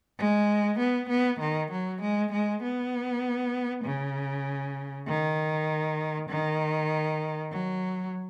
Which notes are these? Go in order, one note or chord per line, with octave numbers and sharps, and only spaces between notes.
G#3
B3
B3
D#3
F#3
G#3
G#3
B3
C#3
D#3
D#3
F#3